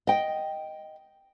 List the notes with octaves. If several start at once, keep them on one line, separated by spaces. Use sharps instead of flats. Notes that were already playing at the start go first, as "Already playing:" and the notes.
D#5 G5